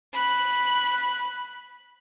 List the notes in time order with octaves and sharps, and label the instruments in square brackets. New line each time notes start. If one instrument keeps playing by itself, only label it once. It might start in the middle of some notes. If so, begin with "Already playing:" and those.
[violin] B5 F#6